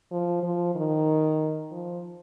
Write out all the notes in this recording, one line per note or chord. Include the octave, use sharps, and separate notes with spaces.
F3
F3
D#3
F3